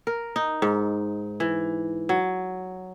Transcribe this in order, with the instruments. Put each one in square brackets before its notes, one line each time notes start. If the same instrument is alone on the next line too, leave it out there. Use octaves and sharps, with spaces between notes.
[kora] A#4
D#4
G#2
E3
F#3